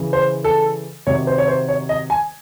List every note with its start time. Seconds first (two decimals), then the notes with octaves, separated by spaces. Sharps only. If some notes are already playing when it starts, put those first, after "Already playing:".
Already playing: C#3 E3
0.13 C5
0.44 A4
1.07 C3 D#3 F#3 C#5
1.27 C5
1.38 C#5
1.48 C5
1.68 C#5
1.89 D#5
2.10 G#5